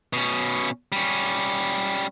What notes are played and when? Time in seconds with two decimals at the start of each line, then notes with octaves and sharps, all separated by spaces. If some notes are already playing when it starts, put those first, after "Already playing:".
0.13 B2 C#4
0.92 G3 C#4